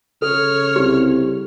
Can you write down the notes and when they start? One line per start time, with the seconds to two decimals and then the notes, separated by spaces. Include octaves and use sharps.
0.22 C#3 A4 C#5 F6
0.76 C2 G4